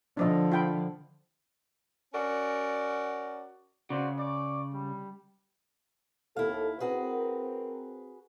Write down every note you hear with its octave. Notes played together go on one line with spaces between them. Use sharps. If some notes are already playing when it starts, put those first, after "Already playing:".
D3 F3 D4 D5 D#5
F4 G5 B5
C#4 F#4 A#4 D5
C#3 F#4 C5 D5
D5 C#6 D6
G3
D#2 E4 A4 F5
C4 F#4 G#4 A#4 B4